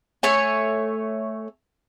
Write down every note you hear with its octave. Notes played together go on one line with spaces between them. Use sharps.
A3 C#5 G#5